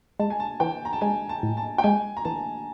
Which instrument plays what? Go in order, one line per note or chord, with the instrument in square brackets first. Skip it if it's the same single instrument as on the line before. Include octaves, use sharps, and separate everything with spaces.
[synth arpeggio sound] G#3 [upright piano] A5
[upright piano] G#5
A5
[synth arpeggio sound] E3 [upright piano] G5
[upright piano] A#5
A5
[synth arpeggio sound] G#3 [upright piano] G#5
[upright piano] A5
[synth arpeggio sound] A2
[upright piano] A5
G5
[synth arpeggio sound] G#3 [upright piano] G#5
[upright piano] A#5
[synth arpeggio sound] E3 [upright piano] A5